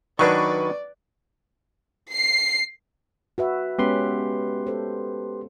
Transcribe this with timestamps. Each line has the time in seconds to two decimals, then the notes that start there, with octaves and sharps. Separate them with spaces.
0.19 D#3 F#3 D4 B4 D5 C#6
2.14 C7
3.38 F#4 B4 E5
3.78 G#3 B3 C#4 G4 B4 C6
4.67 A4 C5